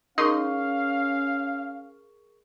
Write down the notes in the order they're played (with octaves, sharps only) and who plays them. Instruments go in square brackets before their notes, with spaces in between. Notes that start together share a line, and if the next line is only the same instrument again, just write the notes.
[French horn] C#4 [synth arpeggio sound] D#4 C6 D#6 [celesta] G#4 A#4 C#6 [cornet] F5